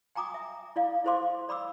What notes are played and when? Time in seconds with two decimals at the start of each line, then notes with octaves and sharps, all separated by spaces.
0.15 G5 G#5 A#5 D6 D#6
0.34 E5
0.76 E4 D5 F5
1.04 E4 G#4 C5 F5 C6 D6
1.49 D5 B5 D6 E6